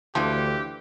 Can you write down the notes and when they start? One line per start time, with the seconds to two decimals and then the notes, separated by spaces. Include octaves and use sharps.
0.15 D2 E3 F3 D4 G4